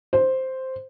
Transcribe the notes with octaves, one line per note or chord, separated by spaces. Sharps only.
C5